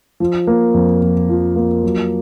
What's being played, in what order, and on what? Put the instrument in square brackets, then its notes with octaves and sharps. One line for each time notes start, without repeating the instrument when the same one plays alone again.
[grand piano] F3
A#3
F2
F2
F3
A#3
F#3